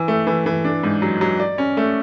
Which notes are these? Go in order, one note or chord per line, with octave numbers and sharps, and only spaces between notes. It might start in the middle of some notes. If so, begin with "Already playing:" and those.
Already playing: E3
A3
E3
E3
D4
G#2
F#3
F#3
D5
C#4
A3